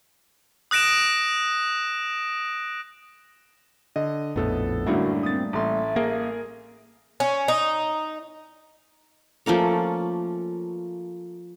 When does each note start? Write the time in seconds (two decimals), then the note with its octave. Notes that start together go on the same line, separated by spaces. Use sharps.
0.71 D#6 F#6 A#6 D7 E7
3.96 D3 D#5
4.36 A#1 F2 A2 B3 A4
4.87 F#2 A2 D3 G3 A3 A#3 F#4
5.23 C4 D#6 A6
5.53 A1 E5 C6
5.96 A#3 G#4 A#4
7.20 C#4
7.48 D#4
9.46 F3 A3 A#3 C#4